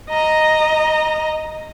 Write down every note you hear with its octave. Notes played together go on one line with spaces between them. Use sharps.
D#5 A#5